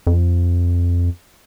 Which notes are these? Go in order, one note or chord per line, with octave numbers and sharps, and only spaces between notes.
F2